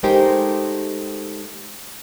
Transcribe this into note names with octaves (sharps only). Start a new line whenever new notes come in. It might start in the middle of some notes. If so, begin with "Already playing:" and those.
G#3 A3 D#4 G4 A#4 C5